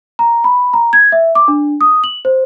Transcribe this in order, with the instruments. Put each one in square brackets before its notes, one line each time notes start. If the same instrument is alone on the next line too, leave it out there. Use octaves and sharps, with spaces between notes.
[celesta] A#5
B5
A#5
G#6
E5
D6
D4
D#6
F#7
C5